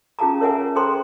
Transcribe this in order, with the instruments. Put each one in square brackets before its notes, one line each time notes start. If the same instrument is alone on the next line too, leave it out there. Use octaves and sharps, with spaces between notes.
[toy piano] C#4 F4 G#4 F5 A5 A#5
A#4 C#5 E5 F#5 G#5 A#5
G#4 A4 C5 G5 A#5 C6